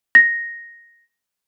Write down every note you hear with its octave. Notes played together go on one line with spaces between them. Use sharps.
A#6